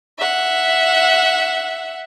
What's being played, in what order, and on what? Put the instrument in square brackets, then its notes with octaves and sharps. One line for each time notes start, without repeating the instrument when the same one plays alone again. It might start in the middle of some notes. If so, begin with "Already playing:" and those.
[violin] E5 F#5